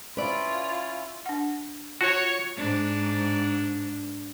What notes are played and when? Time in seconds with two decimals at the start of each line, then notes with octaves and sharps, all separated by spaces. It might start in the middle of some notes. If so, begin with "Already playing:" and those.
0.17 C#4 E4 F4 B4 D5
1.26 D4 F#5
2.01 F4 F#4 C#5
2.56 G#2 D4